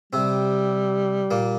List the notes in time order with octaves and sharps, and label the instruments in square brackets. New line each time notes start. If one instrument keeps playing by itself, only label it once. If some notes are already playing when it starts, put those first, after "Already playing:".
[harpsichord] C3 C4 [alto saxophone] G3
[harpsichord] A#2 A#3